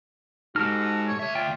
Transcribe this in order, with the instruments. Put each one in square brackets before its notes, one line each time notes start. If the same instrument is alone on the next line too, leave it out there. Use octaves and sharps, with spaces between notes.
[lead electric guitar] G#3 D#4 [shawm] F#4 [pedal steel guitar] G4 A4 F6
[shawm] C#5
[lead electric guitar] D2 E5 [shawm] C#5
[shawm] F4 [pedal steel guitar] G5